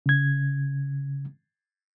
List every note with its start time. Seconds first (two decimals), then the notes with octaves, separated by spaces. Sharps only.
0.06 C#3 G#6